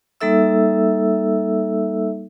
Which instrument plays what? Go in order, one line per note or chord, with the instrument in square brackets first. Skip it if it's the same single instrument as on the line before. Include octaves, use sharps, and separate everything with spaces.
[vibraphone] G3 A#3 D#4 A4 E5 E6